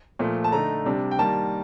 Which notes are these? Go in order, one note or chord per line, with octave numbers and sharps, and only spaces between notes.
A#2 F3 A3
A5
D3 A3 D#4 A#5
C3 G3 D4
G5
D#3 G3 A#3 A5